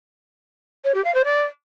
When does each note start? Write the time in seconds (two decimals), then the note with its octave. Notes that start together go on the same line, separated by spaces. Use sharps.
0.84 C#5
0.94 G4
1.04 F5
1.14 C5
1.24 D5